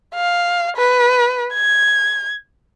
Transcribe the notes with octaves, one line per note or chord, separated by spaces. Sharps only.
F5
B4
G#6